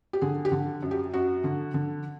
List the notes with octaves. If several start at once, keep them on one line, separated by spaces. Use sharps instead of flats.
G4
D3 G#4
G4
D3
F#2
G4
F#2 F#4
D3
D3